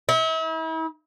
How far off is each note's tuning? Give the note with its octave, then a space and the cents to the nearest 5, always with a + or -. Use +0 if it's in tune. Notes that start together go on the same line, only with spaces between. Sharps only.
E4 -40